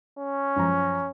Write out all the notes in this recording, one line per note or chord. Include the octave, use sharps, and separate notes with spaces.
C#4
F#2 F3 A#5